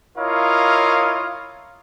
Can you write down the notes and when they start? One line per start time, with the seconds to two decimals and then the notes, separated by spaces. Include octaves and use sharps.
0.18 E4 F4 A#4 C#5 D#5 F5